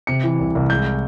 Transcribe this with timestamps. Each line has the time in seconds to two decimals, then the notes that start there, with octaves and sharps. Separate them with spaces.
0.07 C3 C#7
0.24 E3
0.40 C2
0.55 C2
0.70 G#3 G6